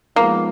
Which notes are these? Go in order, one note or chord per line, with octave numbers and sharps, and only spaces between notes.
F3 G#3 A#3 B3 D#4